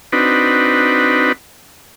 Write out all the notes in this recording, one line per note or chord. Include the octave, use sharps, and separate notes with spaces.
C4 D4 D#4 F#4 B4